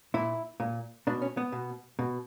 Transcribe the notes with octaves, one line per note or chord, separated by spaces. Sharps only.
A#2 E4
A#2
B2 D4
C#4
B3
B2
B2